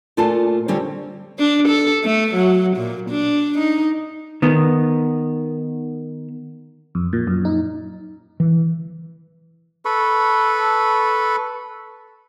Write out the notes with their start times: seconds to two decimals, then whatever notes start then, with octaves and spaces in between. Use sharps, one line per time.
0.17 A#2 A3 F4 A4 G#5 A5
0.68 D3 G3 C4 C#4
1.39 D4
1.68 A4
2.04 A3
2.34 F#3
2.76 A#2
3.10 D4
3.58 D#4
4.42 D#3 B3
6.95 F2
7.13 A#2
7.27 F#2
7.45 D#4
8.40 E3
9.85 A4 B4 B5 C#6